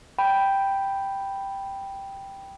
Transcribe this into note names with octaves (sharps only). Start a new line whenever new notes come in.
G5 B5